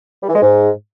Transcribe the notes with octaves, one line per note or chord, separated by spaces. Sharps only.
G3
E3
G#3
G#2